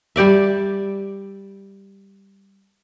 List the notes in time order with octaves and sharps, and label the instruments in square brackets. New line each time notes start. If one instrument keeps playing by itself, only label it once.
[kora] G3 G4 D5 E5